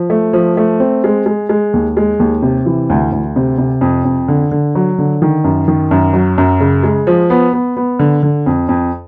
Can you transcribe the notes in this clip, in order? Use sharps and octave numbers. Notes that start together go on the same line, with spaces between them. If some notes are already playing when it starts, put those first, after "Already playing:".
Already playing: F3
A3
F3
A3
C4
G#3
G#3
G#3
D#2
G#3
D#2
C3
E3
D2
D2
C3
C3
F2
F2
D3
D3
F#3
D3
D#3
F#2
D#3
F#2
F#3
F#2
C#3
G#3
F3
B3
B3
B3
D3
D3
F2
F2